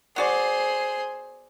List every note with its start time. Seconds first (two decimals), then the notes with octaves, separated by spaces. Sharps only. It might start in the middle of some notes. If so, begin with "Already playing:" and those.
0.16 B3 F#4 G#4 C5 D5